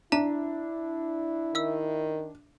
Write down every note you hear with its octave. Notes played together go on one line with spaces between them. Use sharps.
D4 E4 E5 A5 A#5
D#3 E5 E6